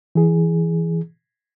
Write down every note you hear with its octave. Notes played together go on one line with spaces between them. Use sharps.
E3 G#4